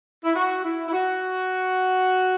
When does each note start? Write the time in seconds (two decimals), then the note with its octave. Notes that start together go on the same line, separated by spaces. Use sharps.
0.24 E4
0.35 F#4
0.64 E4
0.88 E4
0.92 F#4